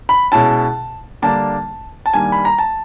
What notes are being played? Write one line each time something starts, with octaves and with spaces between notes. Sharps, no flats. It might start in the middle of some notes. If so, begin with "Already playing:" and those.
B5
B2 G#3 C#4 E4 A5
D3 G3 A#3 D4 A5
A5
D#3 G3 A#3 D4 G#5
B5
A#5
A5